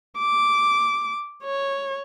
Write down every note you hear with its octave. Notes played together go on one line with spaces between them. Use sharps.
D6
C#5